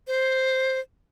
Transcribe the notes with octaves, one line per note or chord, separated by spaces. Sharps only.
C5